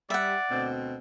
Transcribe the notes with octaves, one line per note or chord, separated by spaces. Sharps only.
G3 D5 E5 F#5
D2 B2 C4